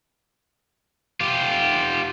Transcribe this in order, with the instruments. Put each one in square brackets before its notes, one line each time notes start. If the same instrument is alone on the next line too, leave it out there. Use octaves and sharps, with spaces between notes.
[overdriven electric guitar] F4 G4